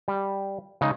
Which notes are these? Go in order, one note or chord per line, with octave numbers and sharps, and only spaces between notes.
G3
C#3 G#3 D#4